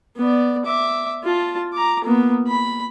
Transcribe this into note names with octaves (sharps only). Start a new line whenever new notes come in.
B3 D5
E5 D6
F4 A5
A#5 D6
A#3 B3
B5